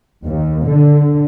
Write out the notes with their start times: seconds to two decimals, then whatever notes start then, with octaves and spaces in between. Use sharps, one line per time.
0.24 D#2
0.66 D3